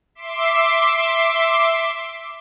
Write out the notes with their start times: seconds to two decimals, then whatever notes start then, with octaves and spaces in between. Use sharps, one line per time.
0.15 E5 C6 D6